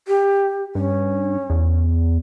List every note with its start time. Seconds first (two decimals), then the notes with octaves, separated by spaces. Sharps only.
0.08 G4
0.75 G2 C#4
1.50 E2